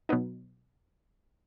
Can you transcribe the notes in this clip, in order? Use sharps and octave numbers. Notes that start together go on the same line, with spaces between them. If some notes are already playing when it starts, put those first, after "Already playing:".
B2 F#3 B3 D#4